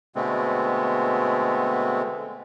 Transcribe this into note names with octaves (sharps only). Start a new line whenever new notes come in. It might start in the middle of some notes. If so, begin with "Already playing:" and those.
B2 D3 G#3 A3 B3 C4